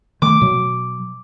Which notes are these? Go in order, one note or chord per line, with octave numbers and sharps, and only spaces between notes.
D#3 A3 D6
B2 F#3